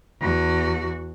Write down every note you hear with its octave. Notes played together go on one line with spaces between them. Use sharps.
E2 F#4